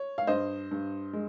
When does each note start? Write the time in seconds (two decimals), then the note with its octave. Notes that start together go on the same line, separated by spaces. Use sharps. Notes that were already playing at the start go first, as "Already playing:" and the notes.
Already playing: C#5
0.18 F5
0.27 G2 C5 D#5
0.71 G2
1.13 G#3